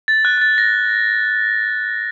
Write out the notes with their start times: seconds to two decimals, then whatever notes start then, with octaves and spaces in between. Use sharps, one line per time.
0.08 A6
0.25 F#6
0.37 F#6
0.41 A6
0.58 A#6